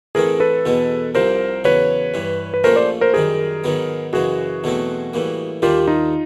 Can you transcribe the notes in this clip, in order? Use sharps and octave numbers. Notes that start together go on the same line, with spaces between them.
A2 E3 A3 C4 G#4 A#4
A4 B4
E2 B2 G#3 B3
C2 C3 F3 A#4 C5
E2 C#3 F#3 B4 C#5
G2 E3 G3
B4
A#1 A#2 F3 A3 C#4 A#4 C5
C5 D5
A#4 C5
F#2 D#3 G3 G#4 A#4
G#2 D#3 F#3 B3
F#2 C#3 E3 G#3 F#4 G#4
E2 B2 F#3 A3 C4
A2 E3 G3 A#3
D#2 D#3 G3 A#3 D4 F4 G4
D#4 F4